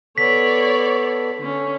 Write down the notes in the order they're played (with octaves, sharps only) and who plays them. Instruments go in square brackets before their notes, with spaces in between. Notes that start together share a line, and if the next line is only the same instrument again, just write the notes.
[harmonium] B3 A4 [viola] C#5 D5 [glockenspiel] B6
[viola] D3 C#4